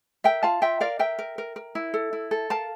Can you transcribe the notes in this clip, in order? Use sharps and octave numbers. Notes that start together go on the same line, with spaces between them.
A#4 E5 G5
F4 F5 A5
F4 E5 G5
A#4 D5 F5
A#4 E5 G5
A#4
A#4
A#4
E4
A4
E4
A4
A#4 F5 A5